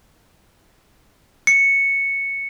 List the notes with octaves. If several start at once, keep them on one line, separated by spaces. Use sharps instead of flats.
C#7